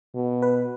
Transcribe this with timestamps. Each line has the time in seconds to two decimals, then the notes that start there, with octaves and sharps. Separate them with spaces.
0.15 B2
0.42 B4